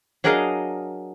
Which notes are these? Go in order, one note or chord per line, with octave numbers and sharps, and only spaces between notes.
F#3 D4 G#4 A#4 D#5 F5